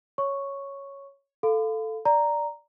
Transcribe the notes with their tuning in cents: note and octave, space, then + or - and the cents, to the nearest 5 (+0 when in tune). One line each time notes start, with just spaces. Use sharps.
C#5 +0 C#6 +0
A4 +0 F5 +0 B5 +45
D5 +0 A#5 +0